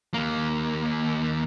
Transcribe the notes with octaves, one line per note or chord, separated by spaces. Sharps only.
D#2 A#3